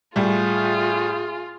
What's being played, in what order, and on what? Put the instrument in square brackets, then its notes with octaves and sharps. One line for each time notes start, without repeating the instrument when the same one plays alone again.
[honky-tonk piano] A2 G3 [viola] F4 [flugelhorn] G#4